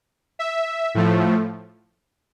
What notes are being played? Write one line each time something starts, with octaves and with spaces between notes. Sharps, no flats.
E5
A2 F3 A3